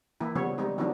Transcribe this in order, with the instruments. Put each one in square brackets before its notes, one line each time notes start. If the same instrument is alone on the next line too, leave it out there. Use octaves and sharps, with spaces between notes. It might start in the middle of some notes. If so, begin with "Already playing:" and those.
[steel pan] E3 A#3 E4
C#3 F3 G3 B3 C#5
G3 G#3 C4 D#4
D#3 F3 F#3 B3 D4 D#4